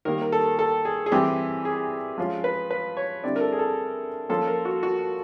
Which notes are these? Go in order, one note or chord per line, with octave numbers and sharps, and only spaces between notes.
D#3 G3 A#3 A#4
A#4
A4
A4
G#4
G#4
E3 G3 C4 G4
G#4
F3 G#3 C#4 F4
B4
B4
C#5
D3 G3 C4 E4 D5
A#4
A4
G#4
A4
F3 A#3 C#4 F4 A4
A#4
F#4
F#4